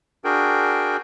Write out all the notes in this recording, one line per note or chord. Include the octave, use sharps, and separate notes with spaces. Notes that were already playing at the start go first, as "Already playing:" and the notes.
D4 F#4 G#4 A#4 G5